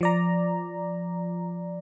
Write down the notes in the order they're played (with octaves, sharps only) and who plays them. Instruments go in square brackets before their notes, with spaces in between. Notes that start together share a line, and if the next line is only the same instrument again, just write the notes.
[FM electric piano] F3 D5 A#5